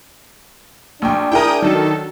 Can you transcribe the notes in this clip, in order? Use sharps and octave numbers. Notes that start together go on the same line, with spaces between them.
A#1 D4 G5
E4 G#4 A#4 G5 D#6
D#3 F#3 A4